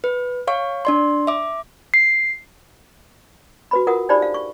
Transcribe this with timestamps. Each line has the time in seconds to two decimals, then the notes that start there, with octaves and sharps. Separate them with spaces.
0.04 B4
0.47 C#5 F5 C#6
0.85 D4 D5 C6
1.27 E5 D6
1.94 C7
3.71 F#4 B4 B5
3.87 F4 A#4 F#5 D#6
4.09 D4 D#4 G4 C5 D5 B5
4.22 F5
4.34 C#6